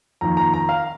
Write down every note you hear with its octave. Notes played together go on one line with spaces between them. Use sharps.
F2 D#3 A#3 A#5
A#5
A#5
F5